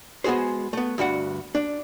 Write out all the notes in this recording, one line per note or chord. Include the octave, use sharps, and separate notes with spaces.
G#3 B3 F#4 G#4 C5
A3 B3
D2 G2 F#4 F#5
D4